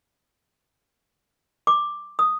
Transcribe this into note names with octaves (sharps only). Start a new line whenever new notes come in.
D6
D#6